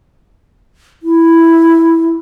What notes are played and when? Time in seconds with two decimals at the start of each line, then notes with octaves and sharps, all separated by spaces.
1.03 E4